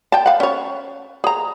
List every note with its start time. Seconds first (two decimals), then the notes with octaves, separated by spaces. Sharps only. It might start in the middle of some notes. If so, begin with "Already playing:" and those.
0.12 G5 A5
0.26 F5 F#5
0.40 C#4 C#5
1.24 G#4 A#5